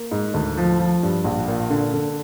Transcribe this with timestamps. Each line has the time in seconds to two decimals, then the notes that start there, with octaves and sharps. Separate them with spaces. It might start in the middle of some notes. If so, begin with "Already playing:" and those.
Already playing: A#3
0.11 G#2
0.34 D2
0.57 F3
0.79 F3
1.03 G2
1.24 A#1
1.48 A#2
1.70 D3
1.93 D3